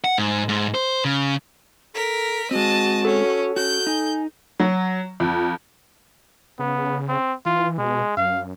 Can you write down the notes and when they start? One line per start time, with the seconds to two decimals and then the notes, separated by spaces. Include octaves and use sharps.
0.04 F#5
0.18 G#2
0.49 G#2
0.75 C5
1.05 C#3
1.95 A4 A#4 B6
2.51 G#3 C4 F#4 D#5 A5
3.05 C#4 A4
3.56 C#4 F#4 G6
3.87 D#4 G#5
4.60 F#3
5.20 F2
6.59 C#3 B3
7.08 C4
7.45 E3 F4
7.78 B2 G#3
8.17 F#2 F5